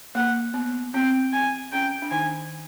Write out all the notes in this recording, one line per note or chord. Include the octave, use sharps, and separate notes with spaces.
A#3 F#5
B3
C4 G5
G#5
C#4 G5
D4
D#3 D#4 G#5